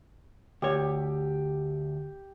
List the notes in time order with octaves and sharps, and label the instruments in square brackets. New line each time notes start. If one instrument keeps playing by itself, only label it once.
[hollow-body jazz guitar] D2 C#5 [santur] G4